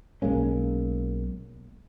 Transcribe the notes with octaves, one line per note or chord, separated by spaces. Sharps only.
B1 G#3 A#3 C#4